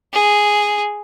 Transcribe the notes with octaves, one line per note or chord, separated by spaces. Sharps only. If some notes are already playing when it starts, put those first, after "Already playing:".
G#4